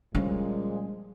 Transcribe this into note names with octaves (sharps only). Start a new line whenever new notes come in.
A#2 F3 G3 G#3 C#4